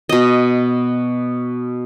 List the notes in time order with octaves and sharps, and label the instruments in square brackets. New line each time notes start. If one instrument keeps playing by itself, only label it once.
[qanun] B2 D#5